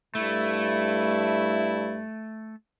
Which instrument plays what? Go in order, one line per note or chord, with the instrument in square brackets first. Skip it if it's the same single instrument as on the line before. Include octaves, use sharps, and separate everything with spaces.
[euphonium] G2 [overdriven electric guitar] A3 [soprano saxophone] E4